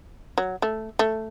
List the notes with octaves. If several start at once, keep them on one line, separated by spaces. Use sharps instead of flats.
F#3
A3
A3